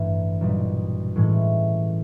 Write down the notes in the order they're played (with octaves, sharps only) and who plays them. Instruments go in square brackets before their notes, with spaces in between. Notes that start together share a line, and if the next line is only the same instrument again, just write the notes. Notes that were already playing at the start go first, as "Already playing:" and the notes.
Already playing: [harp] A1 G2 E3
B1 A#2 G3
A2 E3 G#3 C#4